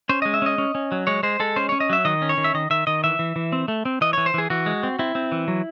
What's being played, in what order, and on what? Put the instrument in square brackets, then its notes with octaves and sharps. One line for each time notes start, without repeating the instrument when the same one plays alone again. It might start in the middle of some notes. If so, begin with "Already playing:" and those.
[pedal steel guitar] C#4 C5
G#3 D#5
E5
C#4 D#5
C#4
C#4
F#3
G#3 C#5
G#3 C5
G#3 A4
C#4 C5
C#4 C#5
D#5
F#3 E5
D#3 D#5
C#4
C#5
D#3
E5
D#3 D#5
D#3 E5
D#3 D#5
E3 E5
E3
E3
C4
A3
C4
E3 D#5
E3 C#5
C5
E3 G#4
E3 F#4
G#3
C4
C4 E4
C4
E3
F#3